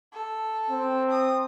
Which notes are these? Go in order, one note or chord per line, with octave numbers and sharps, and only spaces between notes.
A4
C4
D#6